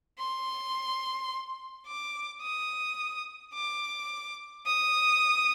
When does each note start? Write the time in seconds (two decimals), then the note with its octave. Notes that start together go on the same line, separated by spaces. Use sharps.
0.18 C6
1.86 D6
2.41 D#6
3.54 D6
4.66 D#6